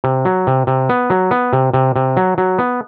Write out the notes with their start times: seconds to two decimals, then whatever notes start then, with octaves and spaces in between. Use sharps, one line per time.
0.04 C3
0.25 F#3
0.47 C3
0.67 C3
0.89 B3
1.10 F#3
1.31 B3
1.53 C3
1.74 C3
1.96 C3
2.17 F#3
2.38 F#3
2.59 B3